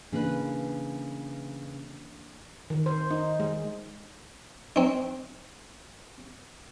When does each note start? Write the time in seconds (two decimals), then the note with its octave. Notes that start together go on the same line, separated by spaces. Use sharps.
0.12 C#3 E3 A#3 D4 B4
2.70 D#3
2.86 C5
3.11 D#4
3.40 G#3
4.76 C4 D#4